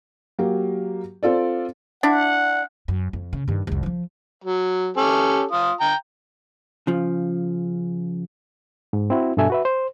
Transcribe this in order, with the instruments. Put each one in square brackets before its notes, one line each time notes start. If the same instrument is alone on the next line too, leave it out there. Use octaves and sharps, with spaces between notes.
[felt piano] F#3 A#3 G4
C4 F4 A4 D5
[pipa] D4 E4 [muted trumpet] F#5
[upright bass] F#2
F2
C#3
G2 D#3
C2 F2
E3 F3
[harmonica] F#3
C#4 G4 A4
F4 D#6
G5 A#5
[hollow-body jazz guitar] C#3 F3
[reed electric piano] G#2
C4 E4 F#4
G2 B2 D4 A4 E5 G#5
F#4 B4 E5
C5